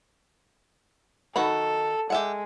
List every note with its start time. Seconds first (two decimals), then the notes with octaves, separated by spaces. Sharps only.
1.36 D#3 F#4 A4 B5
2.10 G#3 G4 E5 F#5